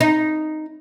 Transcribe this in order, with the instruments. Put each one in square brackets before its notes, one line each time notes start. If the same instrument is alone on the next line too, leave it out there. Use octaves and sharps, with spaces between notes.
[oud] D#4